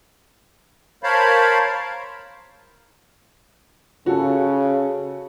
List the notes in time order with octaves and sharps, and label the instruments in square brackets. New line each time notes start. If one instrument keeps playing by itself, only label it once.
[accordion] A#4 C5 C#5 F5 A5 B5
[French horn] C#3 [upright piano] F#4 A4